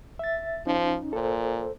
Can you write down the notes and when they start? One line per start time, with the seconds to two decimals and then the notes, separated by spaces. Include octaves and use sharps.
0.19 E5 A6
0.67 F3 C#4 D#4
1.13 A#2 A4 C5